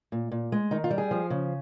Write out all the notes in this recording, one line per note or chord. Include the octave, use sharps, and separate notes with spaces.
A#2
A#2
G#3
D#3 D#4
F4
G3
G#4
F3
C#3